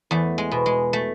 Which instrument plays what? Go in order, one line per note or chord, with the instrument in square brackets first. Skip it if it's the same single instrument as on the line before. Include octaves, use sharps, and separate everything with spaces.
[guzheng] E2 A3
G#3
B2
G#3
A3